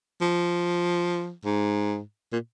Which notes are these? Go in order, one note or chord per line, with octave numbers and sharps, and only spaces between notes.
F3
G#2
A#2